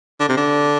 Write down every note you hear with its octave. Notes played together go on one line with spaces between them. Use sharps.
D3
C3
D3